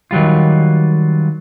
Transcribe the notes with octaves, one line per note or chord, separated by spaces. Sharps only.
D#3 F#3 G3 F4